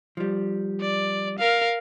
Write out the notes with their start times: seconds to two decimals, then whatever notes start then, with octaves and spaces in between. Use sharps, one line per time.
0.17 F3 G3
0.82 D5
1.39 A#4 F5